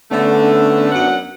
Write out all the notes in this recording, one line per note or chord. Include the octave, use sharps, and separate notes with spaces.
D3 A3 B3 C#4 D4
F#2 F#5